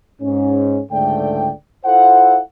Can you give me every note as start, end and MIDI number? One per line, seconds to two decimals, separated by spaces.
0.22 0.81 44
0.22 0.81 61
0.92 1.51 37
0.92 1.51 44
0.92 1.51 50
0.92 1.51 57
0.92 1.51 74
0.92 1.51 79
1.85 2.40 64
1.85 2.40 65
1.85 2.40 69
1.85 2.40 72
1.85 2.40 77
1.85 2.40 78